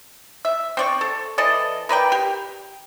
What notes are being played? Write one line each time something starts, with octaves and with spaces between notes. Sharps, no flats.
E5
C4 D5 C#6
A4
E3 A4 D5 D#5
A#4 B4 D5 G5
G4